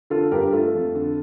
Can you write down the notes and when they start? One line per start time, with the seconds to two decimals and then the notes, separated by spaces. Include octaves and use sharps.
0.10 D3 F4 A4
0.32 G2 G4 A#4
0.52 A3 F4 A4
0.74 F2
0.95 D3